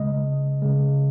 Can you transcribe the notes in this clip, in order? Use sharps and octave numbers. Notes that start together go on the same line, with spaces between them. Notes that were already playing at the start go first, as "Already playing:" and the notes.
Already playing: C#3 G#3 D#5
C#3 G#3